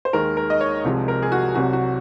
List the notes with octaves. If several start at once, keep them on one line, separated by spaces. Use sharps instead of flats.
C5
D#2 D#3 G#3 D#4 A#4
A#4
D#5
C#5
C2 C3 F3 G#3
A#4
G#4
F#4
C2 C3 F#3 F#4
F#4